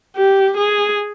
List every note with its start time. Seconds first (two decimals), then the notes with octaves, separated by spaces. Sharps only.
0.17 G4
0.57 G#4